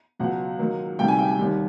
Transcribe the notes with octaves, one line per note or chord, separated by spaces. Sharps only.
C#2 B2 F#3 F#5
G#2 D#3 F#3 A#3
D2 C3 D#3 G3 G5
G#5
G5
G#5
D#2 D#3 G3